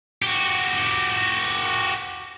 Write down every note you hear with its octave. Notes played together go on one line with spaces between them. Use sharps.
F#4 G4